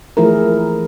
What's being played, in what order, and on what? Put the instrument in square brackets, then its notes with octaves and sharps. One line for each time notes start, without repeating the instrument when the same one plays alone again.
[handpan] E3 F3 A3 E4 G#4 A#4